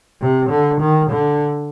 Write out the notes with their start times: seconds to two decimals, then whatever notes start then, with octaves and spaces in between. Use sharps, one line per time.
0.22 C3
0.50 D3
0.81 D#3
1.10 D3